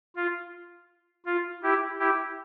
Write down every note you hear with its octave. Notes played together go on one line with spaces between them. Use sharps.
F4
F4
E4 G4
E4 G4